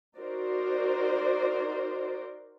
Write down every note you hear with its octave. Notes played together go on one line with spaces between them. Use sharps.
D#4 F#4 A#4 C5 D5